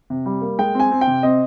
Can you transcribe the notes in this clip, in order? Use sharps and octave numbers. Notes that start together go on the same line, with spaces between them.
C3
G3
A#3
G#3 G5
C4 G#5
C4
G5
C3
C4 D#5